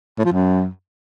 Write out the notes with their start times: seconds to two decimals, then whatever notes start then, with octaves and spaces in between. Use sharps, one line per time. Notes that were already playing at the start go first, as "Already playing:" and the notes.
0.18 A2
0.25 F3
0.32 F#2